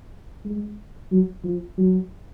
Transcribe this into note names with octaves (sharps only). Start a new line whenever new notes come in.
G#3
F#3
F3
F#3